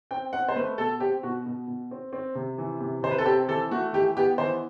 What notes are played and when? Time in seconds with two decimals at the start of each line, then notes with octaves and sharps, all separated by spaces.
0.11 C4 G5
0.33 C4 F#5
0.49 C5
0.56 A3 B4
0.78 B2 A4
1.00 C4 G4
1.23 B2 F#4
1.46 B2
1.68 B2
1.91 C4
2.13 C4
2.35 C3
2.58 E3
2.80 C3
3.03 C3 C5
3.11 B4
3.18 A4
3.25 C4 G4
3.48 E3 A4
3.71 A3 F#4
3.93 E3 G4
4.17 B3 G4
4.38 E3 C5